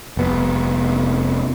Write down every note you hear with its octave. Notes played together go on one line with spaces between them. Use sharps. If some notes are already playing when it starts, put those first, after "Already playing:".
F1 B3